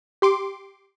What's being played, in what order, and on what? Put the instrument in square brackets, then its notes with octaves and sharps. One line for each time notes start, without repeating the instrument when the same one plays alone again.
[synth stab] G4 C6 D6